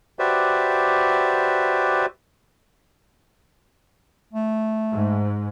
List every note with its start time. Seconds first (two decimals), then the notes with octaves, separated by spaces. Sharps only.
0.19 F#4 G4 B4 C5 D5 E5
4.34 A3
4.92 G#2